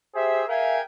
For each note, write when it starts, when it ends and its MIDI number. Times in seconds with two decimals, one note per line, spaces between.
0.15 0.43 67
0.15 0.43 68
0.15 0.43 72
0.15 0.43 76
0.48 0.79 68
0.48 0.79 70
0.48 0.79 76
0.48 0.79 77
0.48 0.79 79
0.48 0.79 80